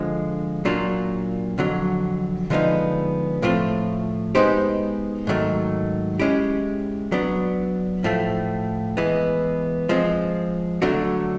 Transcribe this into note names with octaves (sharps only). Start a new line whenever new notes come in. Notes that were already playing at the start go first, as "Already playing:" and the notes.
Already playing: D3 F3 G#3
A#2 F#3 A#3 D4 F4
F2 D3 F#3
D3 F3 G#3 B3 D#4
A2 F3 A3 C4 F4
G#3 B3 D#4 G4 C5
G#2 D#3 F#3 A3
G#3 C#4 E4 G4
F#3 B3 D4
A2 F3 A3
E3 G#3 B3
F3 G#3 C4
D3 F#3 A3 D4 F#4